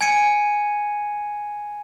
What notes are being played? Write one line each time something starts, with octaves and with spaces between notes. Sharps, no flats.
G#5 G#6 C#7 D#7